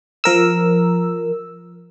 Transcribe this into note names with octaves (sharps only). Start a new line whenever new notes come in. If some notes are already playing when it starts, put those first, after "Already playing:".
F3 A#4 E6